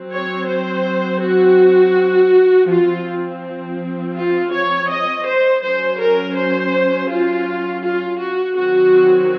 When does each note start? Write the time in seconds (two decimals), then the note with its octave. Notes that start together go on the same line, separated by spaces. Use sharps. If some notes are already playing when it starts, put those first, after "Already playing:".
Already playing: F#3 C4
0.12 C#5
0.48 C5
1.22 F#4
2.69 F3 C4 F4
4.16 F4
4.53 C#5
4.90 D#5
5.26 C5
5.63 F#3 C#4 C5
6.00 A#4
6.37 C5
7.10 F4
7.83 F4
8.20 F#4
8.56 D#3 F#3 C4 F#4